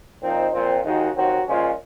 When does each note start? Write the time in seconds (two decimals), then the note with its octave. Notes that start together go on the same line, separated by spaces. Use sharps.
0.22 A#2 F3 C4 D#4
0.53 A#2 F3 C4
0.84 D#2 D#3 G#3 D#4 F#4
1.15 D#2 D#3 F#3 C4 F#4
1.47 A#2 F3 G#3 C#4 F4